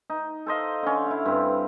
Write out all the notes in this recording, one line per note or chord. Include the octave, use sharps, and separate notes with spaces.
D#4
A4 C5 D#5 F5
D3 C#4
E4 F5
G2 C4